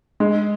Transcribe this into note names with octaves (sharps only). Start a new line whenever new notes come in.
G#3